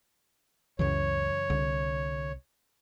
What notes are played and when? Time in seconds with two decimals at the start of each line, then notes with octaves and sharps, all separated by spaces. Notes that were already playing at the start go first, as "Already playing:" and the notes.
0.79 C#2 F#2 C#3 E3 C#5
1.50 C2 D3